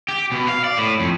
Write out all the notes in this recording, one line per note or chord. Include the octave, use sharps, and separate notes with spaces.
G4
B2
F5
D5
A2
F2